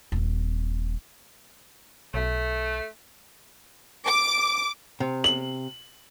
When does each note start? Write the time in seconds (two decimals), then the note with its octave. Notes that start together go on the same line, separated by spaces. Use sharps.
0.12 D#1 C4
2.14 B1 A3
4.06 D6
5.00 C3
5.24 F#7